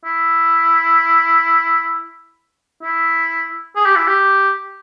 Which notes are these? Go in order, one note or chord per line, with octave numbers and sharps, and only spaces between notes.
E4
E4
G#4
G4
E4
G4